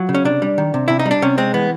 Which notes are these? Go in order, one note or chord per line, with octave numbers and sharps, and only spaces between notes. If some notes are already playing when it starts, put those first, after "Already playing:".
Already playing: F#3 F4
C#3
C#4
C3 D4
G3
D#3
C3
C3 E4
D#4
G3
D4
C3 C#4
G#3 C4
E3 B3